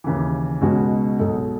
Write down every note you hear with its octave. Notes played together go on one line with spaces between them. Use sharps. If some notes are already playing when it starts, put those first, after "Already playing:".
D#2 C#3 E3
C#2 B2 G#3 C#4 F#4
B1 B2 G#3 D#4 A4